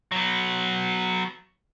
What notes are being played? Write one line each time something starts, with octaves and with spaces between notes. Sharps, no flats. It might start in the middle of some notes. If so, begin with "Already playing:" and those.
F#3 B3